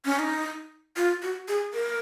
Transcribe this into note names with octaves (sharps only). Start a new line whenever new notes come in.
C#4
D#4
F4
F#4
G#4
A#4